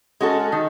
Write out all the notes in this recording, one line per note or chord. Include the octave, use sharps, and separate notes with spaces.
G#3 C#4 F#4 A4
D#3